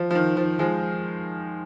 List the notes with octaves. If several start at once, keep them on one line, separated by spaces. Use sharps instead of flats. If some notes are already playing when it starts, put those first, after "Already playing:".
Already playing: F3
F3
D#3
F3
F3 G#3